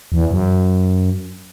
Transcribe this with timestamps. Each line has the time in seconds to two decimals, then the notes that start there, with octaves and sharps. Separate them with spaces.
0.12 E2
0.31 F#2